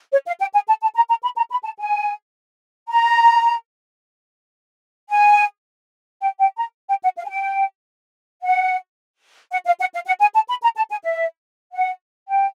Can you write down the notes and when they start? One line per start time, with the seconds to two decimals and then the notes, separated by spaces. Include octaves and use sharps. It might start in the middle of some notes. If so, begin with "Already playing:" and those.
0.12 C#5
0.27 F5
0.40 G5
0.54 G#5
0.68 A5
0.82 A5
0.95 A#5
1.09 A#5
1.23 B5
1.37 A#5
1.51 B5
1.64 A5
1.78 G#5
2.89 A#5
5.10 G#5
6.21 G5
6.39 G5
6.57 A#5
6.89 G5
7.03 F#5
7.17 F5
7.25 G#5
7.31 G5
8.42 F#5
9.52 F#5
9.66 F5
9.80 F#5
9.93 F5
10.07 F#5
10.21 G#5
10.35 A5
10.49 B5
10.63 A#5
10.77 A5
10.91 G#5
11.04 E5
11.73 F#5
12.28 G5